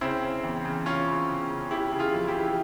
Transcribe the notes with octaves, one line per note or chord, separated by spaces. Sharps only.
C#3 C4 E4
C#3
E2
C#3
C#3 C#4 F4
C#3
C#3
C#3
E3 E4 G4
C#3
F4 G#4
F2
E4 G4
E3